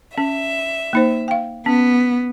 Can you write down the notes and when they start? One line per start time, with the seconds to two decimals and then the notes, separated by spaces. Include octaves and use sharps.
0.18 C#4 E5
0.93 A#3 D#4 C5
1.28 F5 G5
1.66 B3 C#4